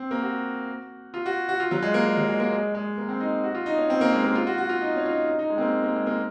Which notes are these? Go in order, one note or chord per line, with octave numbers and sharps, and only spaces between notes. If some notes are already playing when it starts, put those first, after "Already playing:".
Already playing: C4
A#3
F#4
F4
F#4
F#4
F4
F#3
G#3
A#3
G#3
F#3
G#3
A#3
G#3
G#3
A#3
C4
D#4
F#4
F4
D#4
C#4
C4
A#3
G#3
A#3
F4
F#4
F#4
F4
D#4
C#4
F4
D#4
D#4
D#4
G#3
C4
A#3
A#3
G#3
A#3